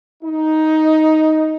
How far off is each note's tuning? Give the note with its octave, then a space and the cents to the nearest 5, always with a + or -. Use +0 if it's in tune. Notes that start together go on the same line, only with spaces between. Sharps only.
D#4 +10